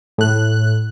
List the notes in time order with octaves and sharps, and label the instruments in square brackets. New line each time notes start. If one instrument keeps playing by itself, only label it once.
[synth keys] A2 F#6